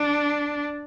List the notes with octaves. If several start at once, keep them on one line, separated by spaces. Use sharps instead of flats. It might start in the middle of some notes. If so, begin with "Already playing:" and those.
Already playing: D4